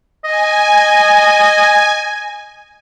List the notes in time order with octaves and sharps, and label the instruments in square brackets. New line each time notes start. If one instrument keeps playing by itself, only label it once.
[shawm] D#5 [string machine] G#5